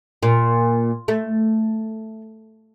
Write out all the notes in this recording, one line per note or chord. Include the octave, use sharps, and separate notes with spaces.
A#2
A3